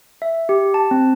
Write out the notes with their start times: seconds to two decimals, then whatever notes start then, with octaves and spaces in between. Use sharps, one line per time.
0.22 E5
0.49 G4
0.74 A5
0.91 C4